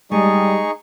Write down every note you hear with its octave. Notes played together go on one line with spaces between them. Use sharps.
G3 G#3 D#4 G#4 G#5 A5 C#6